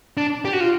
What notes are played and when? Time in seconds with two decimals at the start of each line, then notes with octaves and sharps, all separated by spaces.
0.17 D4
0.45 G4
0.53 F#4
0.60 F4